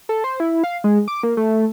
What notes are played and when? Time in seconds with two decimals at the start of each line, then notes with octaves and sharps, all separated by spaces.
0.09 A4
0.24 C5
0.40 E4
0.64 F5
0.84 G#3
1.08 D6
1.23 A#3
1.37 A3